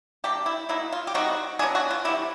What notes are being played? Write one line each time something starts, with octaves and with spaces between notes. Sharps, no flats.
B2 G3 A#3 D4 G4
E4
F#3 A#3 D#4 E4
F4
G4
D#3 G3 C4 D#4 F#4
F#3 B3 D4 G#4
F#4
F4
C3 E3 G3 E4